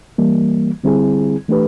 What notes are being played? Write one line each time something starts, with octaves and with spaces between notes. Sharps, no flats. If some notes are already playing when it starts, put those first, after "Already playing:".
E3 G3 A#3
D3 G3 C4 E4 G#4
E3 A3 D4 G4 B4